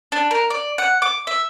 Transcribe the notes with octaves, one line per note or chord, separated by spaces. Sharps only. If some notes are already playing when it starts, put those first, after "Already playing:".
D4
A#4
D5
F#5
D6
E5